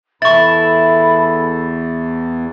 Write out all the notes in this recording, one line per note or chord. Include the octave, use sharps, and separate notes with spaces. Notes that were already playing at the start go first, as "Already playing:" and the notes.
E2 E4 A4 B5 C#6 A6